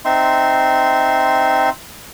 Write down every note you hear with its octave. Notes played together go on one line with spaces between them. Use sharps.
C4 D#4 E5 C6